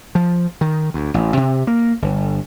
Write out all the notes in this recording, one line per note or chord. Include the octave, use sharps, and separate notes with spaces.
F3
D#3
D2
A1
C3
A#3
G1